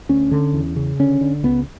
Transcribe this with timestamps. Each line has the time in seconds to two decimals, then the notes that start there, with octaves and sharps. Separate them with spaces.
0.09 D2 C#4
0.31 D3
0.53 E2
0.76 C#3
1.00 D3 C#4
1.21 D3
1.43 C#2 B3